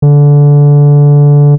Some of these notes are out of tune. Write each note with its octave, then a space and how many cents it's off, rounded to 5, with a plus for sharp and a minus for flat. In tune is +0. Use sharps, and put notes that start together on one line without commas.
D3 -20